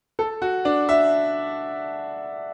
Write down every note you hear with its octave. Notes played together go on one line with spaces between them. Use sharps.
A4
F#4
D4
E5